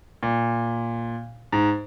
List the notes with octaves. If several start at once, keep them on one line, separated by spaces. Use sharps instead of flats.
A#2
G#2